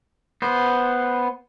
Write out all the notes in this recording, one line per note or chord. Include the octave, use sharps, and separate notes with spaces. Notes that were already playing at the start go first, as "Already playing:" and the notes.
B3 C5